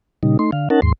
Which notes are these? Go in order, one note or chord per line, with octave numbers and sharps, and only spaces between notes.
A#2 C#3 G3 D#4
A3 D#4 C6
D3 F5
C#4 D#4 A#4 F#5 A5
D#2 G#2 C6